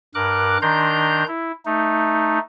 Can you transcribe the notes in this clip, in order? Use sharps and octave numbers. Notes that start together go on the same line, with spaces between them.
G2 A#4 D6 F#6
D#3 D4 A#5 C6 G6
E4
A3 D#4